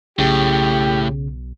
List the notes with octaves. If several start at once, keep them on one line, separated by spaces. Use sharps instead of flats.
B1 A2 C#3 G4